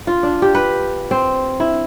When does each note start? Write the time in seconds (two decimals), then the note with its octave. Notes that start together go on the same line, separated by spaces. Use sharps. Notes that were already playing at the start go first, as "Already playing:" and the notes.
0.07 F4
0.23 D4
0.42 G4
0.55 B4
1.11 C4
1.60 E4